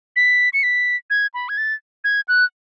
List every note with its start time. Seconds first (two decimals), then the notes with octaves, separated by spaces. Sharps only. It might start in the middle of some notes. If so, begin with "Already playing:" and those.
0.16 B6
0.53 C#7
0.63 B6
1.10 G#6
1.34 B5
1.49 G#6
1.58 A6
2.04 G#6
2.28 F#6